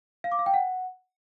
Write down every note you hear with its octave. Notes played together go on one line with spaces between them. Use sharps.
F5
D6
F5
G5
F#5